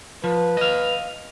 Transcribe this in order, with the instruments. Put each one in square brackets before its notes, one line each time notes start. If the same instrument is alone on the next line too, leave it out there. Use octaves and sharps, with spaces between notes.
[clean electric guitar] F3 [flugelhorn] B4
[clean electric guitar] D#5 F5